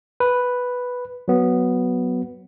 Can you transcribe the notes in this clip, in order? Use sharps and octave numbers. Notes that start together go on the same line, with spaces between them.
B4
F#3 B3